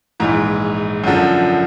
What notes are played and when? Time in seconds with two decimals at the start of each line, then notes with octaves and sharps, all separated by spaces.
0.20 A#1 G#2 E3
1.04 F#2 D3 F3